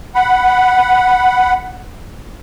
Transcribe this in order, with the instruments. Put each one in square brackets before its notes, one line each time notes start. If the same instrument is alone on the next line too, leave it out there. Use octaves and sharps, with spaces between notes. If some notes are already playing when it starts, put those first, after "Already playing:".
[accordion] F#5 B5